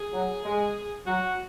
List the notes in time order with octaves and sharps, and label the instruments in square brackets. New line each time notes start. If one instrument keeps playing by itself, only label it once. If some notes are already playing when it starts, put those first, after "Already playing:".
Already playing: [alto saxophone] G#4
[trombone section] F#3
G#3
[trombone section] F#3 [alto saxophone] F#4